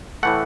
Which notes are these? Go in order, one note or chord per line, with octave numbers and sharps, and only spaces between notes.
A2 E3 A3 F#5